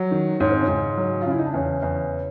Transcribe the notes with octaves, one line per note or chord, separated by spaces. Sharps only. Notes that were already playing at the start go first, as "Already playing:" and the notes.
Already playing: F#3
D#3
G#2 C#4
C4
C#3 C#4
G#2
F#3
F4
C#3 E4
D#4
D4
E2 C#3 C#4
E2